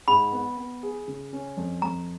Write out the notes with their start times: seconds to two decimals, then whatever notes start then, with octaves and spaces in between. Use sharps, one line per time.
0.08 G#2 B5
0.32 B3
0.57 B3
0.83 G#4
1.08 C#3
1.33 C#4
1.57 F2
1.82 F2 A#5